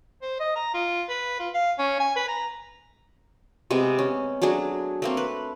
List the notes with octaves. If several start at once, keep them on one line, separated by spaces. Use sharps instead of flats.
C5
D#5
A#5
F4
B4
F4
F5
C#4
G#5
B4
A#5
C3 G#3 B3
C#4
F#3 A3 D4 G#4
A3 A#3 C4
B4